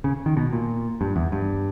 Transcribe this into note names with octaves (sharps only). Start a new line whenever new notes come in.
C#3
D#3
B2
A#2
G2
E2
G2